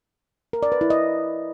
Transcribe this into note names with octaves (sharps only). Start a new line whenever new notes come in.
A#4
D5
B4
E4
D#5